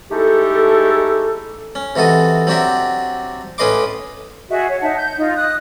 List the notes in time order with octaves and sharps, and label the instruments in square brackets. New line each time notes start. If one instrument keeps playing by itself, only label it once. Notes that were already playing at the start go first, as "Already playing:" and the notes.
[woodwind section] G#3 A3 D#4 E4 G4 A4
[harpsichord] C#4
C3 E3 F#4 A4 D#5
F#3 C4 D4 F#4 G4 E5
A2 C#4 B4 D#5 C6 D6
[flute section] F#4 G#4 D#5 E5
C#5
D#4 E5 F#5 A5
G6
D#4 F4
D#5 D#6 F#6